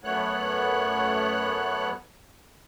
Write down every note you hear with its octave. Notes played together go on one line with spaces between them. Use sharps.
F#2 A3 B3 C#5 F#6